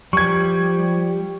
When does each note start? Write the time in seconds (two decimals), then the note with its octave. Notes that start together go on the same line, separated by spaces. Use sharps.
0.13 F3 G3 C#6 G#6